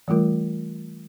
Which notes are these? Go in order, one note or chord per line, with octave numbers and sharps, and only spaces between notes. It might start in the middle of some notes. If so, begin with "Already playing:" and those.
E3 G3 A3 F4 A#4